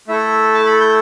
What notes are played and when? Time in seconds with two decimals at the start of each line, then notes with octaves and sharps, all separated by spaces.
0.08 A3 E4 A4 E5
0.54 A5
0.66 B5
0.80 G6